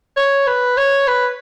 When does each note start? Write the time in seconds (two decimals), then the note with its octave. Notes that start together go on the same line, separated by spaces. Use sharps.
0.17 C#5
0.47 B4
0.77 C#5
1.08 B4